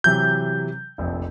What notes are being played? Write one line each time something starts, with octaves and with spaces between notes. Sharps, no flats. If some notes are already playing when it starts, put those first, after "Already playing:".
C3 E3 F#3 G6
F1 A#1 F2